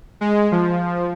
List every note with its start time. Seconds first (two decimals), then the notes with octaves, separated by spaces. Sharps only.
0.21 G#3
0.52 F3